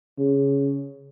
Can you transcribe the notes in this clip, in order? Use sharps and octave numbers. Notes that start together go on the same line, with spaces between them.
C#3